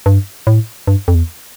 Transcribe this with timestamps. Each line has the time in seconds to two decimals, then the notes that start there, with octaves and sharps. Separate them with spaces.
0.06 G2
0.47 A2
0.88 G2
1.08 F2
1.15 E2